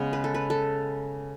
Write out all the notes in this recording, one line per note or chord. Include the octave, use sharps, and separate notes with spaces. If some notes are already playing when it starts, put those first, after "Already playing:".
Already playing: C#3 G#3 B3 C#5
B4
A4
B4
A4